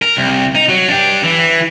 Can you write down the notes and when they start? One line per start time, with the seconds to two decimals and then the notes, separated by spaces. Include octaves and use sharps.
0.02 A#4
0.17 C2
0.55 D#4
0.69 F#3
0.88 D4 G4
1.24 E3